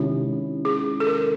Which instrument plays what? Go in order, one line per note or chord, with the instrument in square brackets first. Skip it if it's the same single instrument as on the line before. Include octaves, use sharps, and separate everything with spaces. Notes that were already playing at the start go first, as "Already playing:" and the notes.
Already playing: [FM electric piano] C3 D#3 G#3 C#4 E4 [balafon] G4
[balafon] G#4
A4
A#4